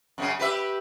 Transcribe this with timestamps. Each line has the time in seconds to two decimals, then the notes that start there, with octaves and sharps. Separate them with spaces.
0.18 F#2 C#3 C#4
0.39 G4 B4 E5